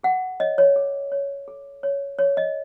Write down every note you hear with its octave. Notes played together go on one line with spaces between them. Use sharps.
G#4 F#5
C#5 D#5
C#5
A4
C#5
A4
C#5
G#4 C#5
D#5